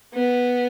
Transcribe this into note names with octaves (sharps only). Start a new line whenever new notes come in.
B3